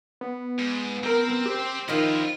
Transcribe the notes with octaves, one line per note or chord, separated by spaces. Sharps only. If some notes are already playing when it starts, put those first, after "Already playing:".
B3
G#2
C4 A#4
G4 C5
D#3 F3 E4 F4 D#5